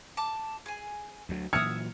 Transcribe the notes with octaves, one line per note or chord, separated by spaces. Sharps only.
A5 D6
G#4 G#5
D2 F#3
A#2 E3 F#3 E5 D#6 F6 G#6 C#7